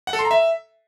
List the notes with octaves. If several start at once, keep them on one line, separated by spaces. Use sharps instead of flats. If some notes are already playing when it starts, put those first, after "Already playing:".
F#5
A4
C6
A#5
E5